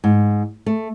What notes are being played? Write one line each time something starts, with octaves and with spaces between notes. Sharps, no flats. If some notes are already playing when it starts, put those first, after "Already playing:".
G#2
A3